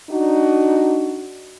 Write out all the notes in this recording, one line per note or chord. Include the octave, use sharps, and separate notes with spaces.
D4 D#4 F#4